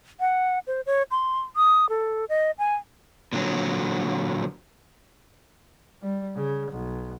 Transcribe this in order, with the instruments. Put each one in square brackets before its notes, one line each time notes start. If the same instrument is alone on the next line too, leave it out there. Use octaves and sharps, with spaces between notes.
[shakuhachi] F#5
C5
C#5
C6
D#6
A4
D#5
G#5
[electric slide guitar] A#2 D3 F#3
[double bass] G3
C#3
B1